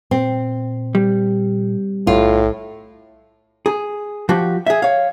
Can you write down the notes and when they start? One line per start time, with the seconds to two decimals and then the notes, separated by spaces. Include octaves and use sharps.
0.11 A#2 C4
0.95 G3
2.07 B1 A2 F4
3.66 G#4
4.29 F3 F#4 G4
4.66 G#4 E5
4.82 C#5 F5